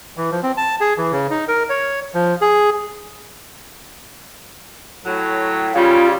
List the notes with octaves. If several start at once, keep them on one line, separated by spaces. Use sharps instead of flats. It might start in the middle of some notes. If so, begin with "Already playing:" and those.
E3
F3
C4
A5
G#4
E3
C#3
D#4
A#4
C#5
F3
G#4
A2 F#3
C#3 G3 F4